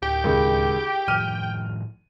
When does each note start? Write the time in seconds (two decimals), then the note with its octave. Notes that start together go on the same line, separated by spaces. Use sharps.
0.03 D1 G4 G5
0.24 C#2 D#3
1.08 A2 D#3 F3 F6 D#7